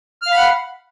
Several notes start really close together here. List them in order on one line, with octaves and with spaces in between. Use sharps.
F6 F5 B5 F#5